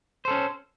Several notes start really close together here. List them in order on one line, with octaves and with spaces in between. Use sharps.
C5 A4 C#4